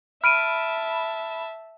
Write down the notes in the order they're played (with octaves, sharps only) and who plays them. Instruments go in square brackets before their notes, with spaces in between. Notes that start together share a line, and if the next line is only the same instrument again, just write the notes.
[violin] E5 A5 [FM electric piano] B5 [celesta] F6 D7 D#7